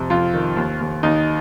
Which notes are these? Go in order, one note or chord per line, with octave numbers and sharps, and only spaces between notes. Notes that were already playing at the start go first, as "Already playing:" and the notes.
Already playing: F2 C3
F2 F4
D#3
D#2
D#2
D#2 D#4